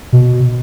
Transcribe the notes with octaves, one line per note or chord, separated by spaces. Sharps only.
B2